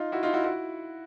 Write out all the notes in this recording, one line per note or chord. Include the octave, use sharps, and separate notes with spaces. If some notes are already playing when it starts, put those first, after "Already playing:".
Already playing: D#4 F4
E4 F#4
D#4 F4
E4 F#4
E4 F#4